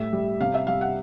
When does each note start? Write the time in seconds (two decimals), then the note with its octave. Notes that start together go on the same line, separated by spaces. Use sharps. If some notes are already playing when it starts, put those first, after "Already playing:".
Already playing: A2 G3 E5
0.13 G3
0.40 C3 F5
0.54 E5
0.67 G3 F5
0.81 F#5